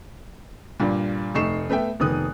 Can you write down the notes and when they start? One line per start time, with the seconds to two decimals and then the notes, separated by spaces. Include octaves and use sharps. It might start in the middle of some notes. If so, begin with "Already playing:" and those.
0.80 G2 A#2 G3
1.34 F1 A3 D#4 C#6 C7 E7
1.69 A3 B3 E5 G5
2.00 F1 D#3 B3 D#6 F#6